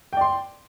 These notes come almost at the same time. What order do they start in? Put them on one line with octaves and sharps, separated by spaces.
G5 D5 C6